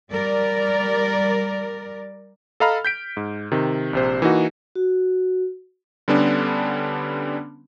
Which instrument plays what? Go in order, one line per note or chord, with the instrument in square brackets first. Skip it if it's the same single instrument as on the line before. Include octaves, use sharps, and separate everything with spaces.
[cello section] G3 A#4 D5
[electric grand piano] A4 D#5 F5 A#5 B5 F6
G6 B6 D7
G#2
C3 D#3
A#1 C3 C5
E3 A#3 D#4 F#4
[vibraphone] F#4
[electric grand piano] D3 G3 B3 C#4 D4